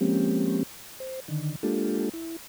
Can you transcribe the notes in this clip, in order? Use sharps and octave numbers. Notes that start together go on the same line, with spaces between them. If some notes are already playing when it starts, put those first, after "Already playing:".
F3 G#3 A#3 C4 C#4 G4
C5
D3 D#3
G#3 A#3 D4 F4 G4 A4
E4